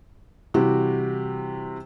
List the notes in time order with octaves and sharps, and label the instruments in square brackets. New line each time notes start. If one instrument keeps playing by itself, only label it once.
[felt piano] C3 E3 G3 F#4 G4